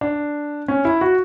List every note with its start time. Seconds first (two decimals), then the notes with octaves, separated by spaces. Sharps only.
0.01 D4
0.68 C#4
0.85 E4
1.01 F#4